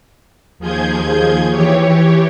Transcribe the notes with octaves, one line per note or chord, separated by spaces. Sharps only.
D#2 F3 G#4 G6 G#6
E3 G4 C#5